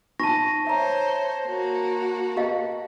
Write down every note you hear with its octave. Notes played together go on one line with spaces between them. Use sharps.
D#4 F4 A5 C#6 A#6
C5 C#5 E5 A#5
A#3 F#4
G4 D#5 F5